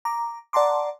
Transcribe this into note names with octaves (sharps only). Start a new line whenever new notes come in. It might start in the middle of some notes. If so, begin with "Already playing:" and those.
A#5 D6
D5 F#5 A5 A#5 C6 D6